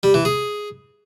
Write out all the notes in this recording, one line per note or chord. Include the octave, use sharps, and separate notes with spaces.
G3
E3
G#4